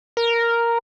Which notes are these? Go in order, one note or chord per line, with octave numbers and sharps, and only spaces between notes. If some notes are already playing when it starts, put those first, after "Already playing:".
A#4